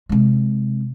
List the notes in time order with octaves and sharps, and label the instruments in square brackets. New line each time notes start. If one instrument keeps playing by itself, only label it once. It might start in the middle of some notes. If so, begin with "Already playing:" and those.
[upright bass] C3 G#3